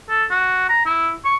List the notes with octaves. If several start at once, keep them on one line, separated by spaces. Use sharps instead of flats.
A4
F#4
A#5
E4
C#6